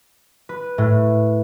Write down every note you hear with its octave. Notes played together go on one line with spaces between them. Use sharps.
B4
A2